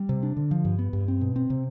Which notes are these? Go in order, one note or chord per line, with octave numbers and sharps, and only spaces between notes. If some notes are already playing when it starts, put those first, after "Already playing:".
Already playing: G3
C3
D4
D3
F3
G2
B3
G2
C4
B2
C4
C3